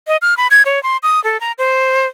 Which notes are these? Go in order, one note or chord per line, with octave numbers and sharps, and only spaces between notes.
D#5
F6
B5
G#6
C#5
C6
D#6
A4
A#5
C5